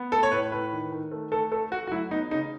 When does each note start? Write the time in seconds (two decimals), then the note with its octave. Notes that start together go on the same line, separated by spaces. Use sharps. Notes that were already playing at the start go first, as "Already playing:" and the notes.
Already playing: B3
0.12 A3 A4
0.23 C#5
0.32 A2 B4
0.52 A2 B4
0.72 D#3
0.92 D#3
1.11 A3
1.32 A3 A4
1.52 A3 A4
1.71 A3 F#4
1.87 F#4
1.91 F#3 E4
2.11 B3 D#4
2.31 C#3 D#4